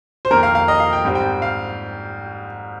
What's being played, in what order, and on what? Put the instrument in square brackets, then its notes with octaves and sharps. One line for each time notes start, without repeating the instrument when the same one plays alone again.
[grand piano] C5
F2 D#3 A#3 A#4
F5
F5
D#5
F5
G5
G#2 G3 C4
G5
F5